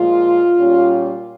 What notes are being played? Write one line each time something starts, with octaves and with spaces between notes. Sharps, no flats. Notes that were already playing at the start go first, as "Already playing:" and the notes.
Already playing: A#2 F3 G#3 F4
A#2 G3 C#4